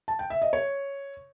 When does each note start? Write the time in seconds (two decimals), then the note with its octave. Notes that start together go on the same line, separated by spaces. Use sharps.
0.08 A5
0.19 G5
0.30 E5
0.42 D#5
0.53 C#5